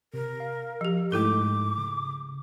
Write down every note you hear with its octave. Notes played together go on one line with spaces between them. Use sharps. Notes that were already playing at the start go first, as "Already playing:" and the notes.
C3 A#4
F5
F3 G4
G#2 G#3 A3 E4 A4 D6
C#3